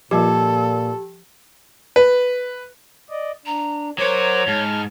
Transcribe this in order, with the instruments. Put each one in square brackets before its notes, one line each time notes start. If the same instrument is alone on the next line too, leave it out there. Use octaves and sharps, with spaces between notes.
[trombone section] A#2 [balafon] F3 G3 B4 [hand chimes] G4 [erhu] A4
[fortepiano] B4
[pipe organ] D5 D#5
[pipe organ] D4 [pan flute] A#5
[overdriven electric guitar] F#3 F#4 [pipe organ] A#4 C5 D6 [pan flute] C#5
[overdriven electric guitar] G#2 [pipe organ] A5 F6